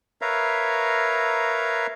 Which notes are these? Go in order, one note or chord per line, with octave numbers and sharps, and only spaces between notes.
A#4 B4 C#5 E5 F5 A#5